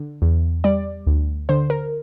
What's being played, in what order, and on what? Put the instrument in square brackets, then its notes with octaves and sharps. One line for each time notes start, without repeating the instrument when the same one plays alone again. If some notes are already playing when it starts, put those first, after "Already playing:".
Already playing: [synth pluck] D3
E2
G3 D5
D2
D3 C5
A#4